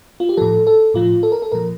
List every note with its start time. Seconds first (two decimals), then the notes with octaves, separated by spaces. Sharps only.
0.20 F4
0.29 G4
0.37 A2 F3 A4
0.67 A4
0.94 A2 F3 F4
1.23 A4
1.32 A#4
1.42 A4
1.52 A#2 F3 A#4